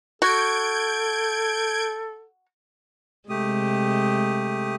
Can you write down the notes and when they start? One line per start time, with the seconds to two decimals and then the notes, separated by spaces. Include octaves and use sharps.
0.22 F#4 A4 G6 G#6 D7
3.29 C3 G#3 A3 G4 D#6